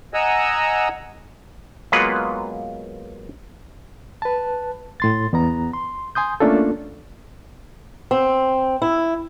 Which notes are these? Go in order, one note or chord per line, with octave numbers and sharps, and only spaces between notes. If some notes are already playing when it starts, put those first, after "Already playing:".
D#5 F#5 G#5 A#5 E6
F#3 G#3 A#3 B3 F4 B4
B4 A5
A2 C6 A6
E2 B3 A#5
C6
G#5 C6 D#6 G6
A3 A#3 C#4 D4 F4 A4
C4
E4